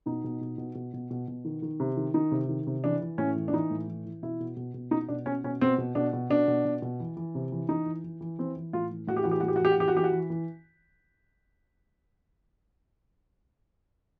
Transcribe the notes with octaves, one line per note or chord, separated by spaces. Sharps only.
B2 D#4
B2
B2
B2
B2
B2
B2
B2
D#3
D#3
C3
D#3
D#3 D#4
C3
D#3
C3
E3 D4
E3
A2 C#4
E3
D4
E3 D#4
A2
E3
E3
B2 E4
B2
B2
B2
B2 D#4
B2 D4
B2 C#4
B2 C#4
B2 C4
B2
B2 D4
B2
B2 D4
B2
B2
B2
E3
E3
C3
E3
E3 D#4
E3
E3
E3
E3 C4
E3
A2 F4
E3
A2 F#4
G4
E3 F#4
G4
A2 F#4
G4
F#4
E3
G4
F#4
E3 G4
F#4
E3 G4
F#4
E3
E3